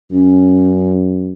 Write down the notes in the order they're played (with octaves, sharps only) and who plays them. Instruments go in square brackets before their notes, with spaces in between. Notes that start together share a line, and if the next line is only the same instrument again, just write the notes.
[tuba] F#2 [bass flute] C#4